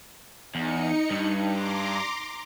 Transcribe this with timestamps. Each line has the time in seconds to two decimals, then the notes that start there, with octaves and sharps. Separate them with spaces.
0.55 E2 D#4 C#7
1.11 G2
1.45 A#5 C6 D6